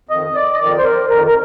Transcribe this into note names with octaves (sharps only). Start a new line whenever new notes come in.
F2 D#3 D#5
D5
D#5
F2 D#3 D5
C5
A#4
F2 D#3 A#4
A#4